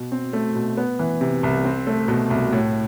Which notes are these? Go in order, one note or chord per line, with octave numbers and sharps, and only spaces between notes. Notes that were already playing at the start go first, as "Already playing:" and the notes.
Already playing: B2
C4
A3
B2
B3
E3
C3
C2
C4
A3
B2
C2
A2